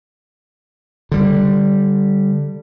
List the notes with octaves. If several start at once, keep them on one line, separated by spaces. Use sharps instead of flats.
D3 G3